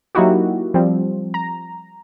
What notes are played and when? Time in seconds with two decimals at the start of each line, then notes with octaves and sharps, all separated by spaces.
0.15 F#3 A#3 D#4 E4 F#4 G4
0.74 F3 G3 C4
1.34 A#5